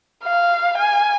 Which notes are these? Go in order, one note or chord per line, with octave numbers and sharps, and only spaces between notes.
F5
G#5